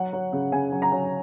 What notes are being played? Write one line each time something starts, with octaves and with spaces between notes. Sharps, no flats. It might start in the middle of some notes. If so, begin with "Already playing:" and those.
Already playing: F#3 F#5
F#3
C#3
C#3 G#5
F#3
A#5
F#3